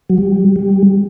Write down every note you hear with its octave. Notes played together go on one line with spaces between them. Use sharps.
F#3
G3
G3